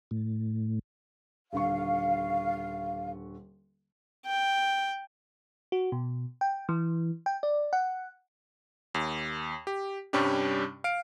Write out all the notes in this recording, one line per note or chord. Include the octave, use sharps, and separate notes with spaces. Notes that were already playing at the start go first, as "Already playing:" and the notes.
A2
D#1 D3 F5 C#6
G5
F#4
B2
G5
E3
G5
D5
F#5
D#2
G4
G2 C3 G3 C#4 D4 G4
F5 D7